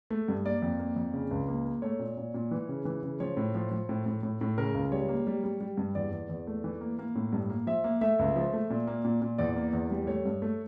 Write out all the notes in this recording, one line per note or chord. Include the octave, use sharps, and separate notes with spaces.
A3
G2
A#3 D5
F2
A#3
F2
C#3
C#2
A#3
A#3
A3 C#5
A#2
A#2
A#2
E3
C#3
E3
C#3
F3 C#5
A2
F3
F3
A2
A2
A2
A2
C#3 A#4
C#2
G3 C#5
A#3
G3
G3
G3
G2
E2 D5
E2
E2
A3
E3
A#3
A#3
A2
G2
A#3
F3 E5
A#3
A3 E5
C#2
F3
A3
A#2
A#3
A#2
A#2
E2 D5
A#3
E2
G3
A3 C#5
G2
A3